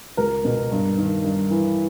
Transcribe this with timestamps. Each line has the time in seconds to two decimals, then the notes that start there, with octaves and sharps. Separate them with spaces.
0.17 C#2 A#4
0.45 B2
0.72 G2
0.97 D#3
1.24 G2
1.50 E3